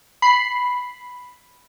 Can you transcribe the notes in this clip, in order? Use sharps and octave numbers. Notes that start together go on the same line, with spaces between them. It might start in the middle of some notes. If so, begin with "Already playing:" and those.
B5 C7